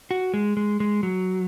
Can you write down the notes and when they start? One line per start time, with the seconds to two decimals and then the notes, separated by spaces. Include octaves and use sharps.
0.11 F#4
0.34 G#3
0.57 G#3
0.80 G#3
1.03 F#3